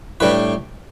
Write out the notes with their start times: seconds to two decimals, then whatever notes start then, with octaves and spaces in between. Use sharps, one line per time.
0.20 A2 G3 D4 B4